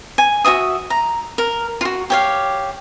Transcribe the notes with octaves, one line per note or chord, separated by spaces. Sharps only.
G#5
F#4 D#5 E5 D#6
A#5
A#4
F4 F#4
G4 C#5 F5